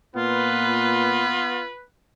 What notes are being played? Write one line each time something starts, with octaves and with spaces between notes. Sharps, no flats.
A#2 B3 F4 B4